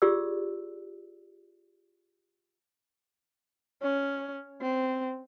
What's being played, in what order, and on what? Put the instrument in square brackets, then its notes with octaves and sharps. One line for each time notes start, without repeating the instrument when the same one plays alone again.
[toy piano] F4 G4 G#4 D5 E6
[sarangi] C#4
C4